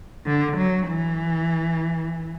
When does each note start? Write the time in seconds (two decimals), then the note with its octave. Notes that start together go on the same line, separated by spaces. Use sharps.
0.26 D3
0.58 F#3
0.88 E3